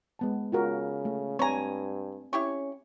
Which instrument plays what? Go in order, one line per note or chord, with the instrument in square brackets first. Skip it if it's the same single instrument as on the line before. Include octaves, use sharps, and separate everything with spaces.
[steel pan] G#3 B3 A5
[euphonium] C#3 [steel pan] F4 F#4 A#4
[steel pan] A3
[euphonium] G2 [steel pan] C4 G#5 [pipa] C#5 A#5
[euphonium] C#4 [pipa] E4 G4 C#6